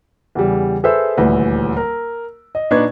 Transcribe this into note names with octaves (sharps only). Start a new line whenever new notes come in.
E2 C#3 G3
G#4 A4 B4 C5 E5 E6
D#1 D2 E3 B4
A#4
D#5
A#2 D4 D#4 B4 C#6 G#6